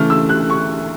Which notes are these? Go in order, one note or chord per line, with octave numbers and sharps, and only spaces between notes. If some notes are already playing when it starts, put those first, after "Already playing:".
Already playing: C#3 E3 A3 F6
E6
F#6
C#6